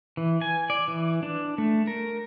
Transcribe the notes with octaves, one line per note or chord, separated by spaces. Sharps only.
E3
G#5
D5
E3
D4
A3
A#4